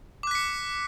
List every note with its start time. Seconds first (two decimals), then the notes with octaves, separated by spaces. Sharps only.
0.23 D6
0.27 F#6
0.31 B6
0.35 C#7